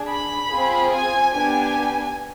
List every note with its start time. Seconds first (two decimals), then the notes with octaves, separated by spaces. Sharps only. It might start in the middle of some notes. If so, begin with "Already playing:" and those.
Already playing: D4 G#4
0.09 B5
0.50 C4 F4 G#4
0.92 G#5
1.33 B3 D4 G4 G#5